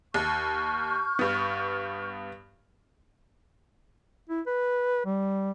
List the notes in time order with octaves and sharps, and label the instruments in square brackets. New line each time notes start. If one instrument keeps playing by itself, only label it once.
[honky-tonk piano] D#2 [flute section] C#6 F6 G6
[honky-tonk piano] G2 B3
[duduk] E4
B4
G3